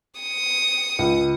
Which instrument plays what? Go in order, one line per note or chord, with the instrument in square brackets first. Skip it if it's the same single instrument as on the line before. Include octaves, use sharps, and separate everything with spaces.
[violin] D#6 C#7
[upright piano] C#2